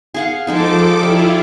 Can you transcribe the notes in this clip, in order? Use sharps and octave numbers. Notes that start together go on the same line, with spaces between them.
G#4 F5 F#5
F3 G#3 D#4 G#4 A4 D6
G3 E4 F4